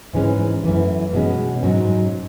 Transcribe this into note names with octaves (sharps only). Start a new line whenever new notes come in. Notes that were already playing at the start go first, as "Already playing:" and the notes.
G#2 E3 G#3 C#4
F#2 E3 A3
B2 G#3 C#4
G#2 F#3 C#4